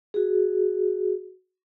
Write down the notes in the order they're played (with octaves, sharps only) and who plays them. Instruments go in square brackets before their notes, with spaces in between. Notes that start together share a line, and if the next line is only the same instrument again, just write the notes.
[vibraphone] F#4 G#4